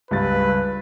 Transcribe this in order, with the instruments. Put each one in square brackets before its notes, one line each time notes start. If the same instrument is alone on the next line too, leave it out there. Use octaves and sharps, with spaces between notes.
[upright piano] C#2 G2 A6 [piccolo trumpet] B4